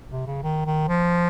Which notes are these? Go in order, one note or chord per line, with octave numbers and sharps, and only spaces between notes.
C3
C#3
D#3
D#3
F3